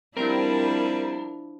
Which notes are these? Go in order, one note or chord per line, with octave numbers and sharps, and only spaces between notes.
F3 G3 C4 D4 E4 A#4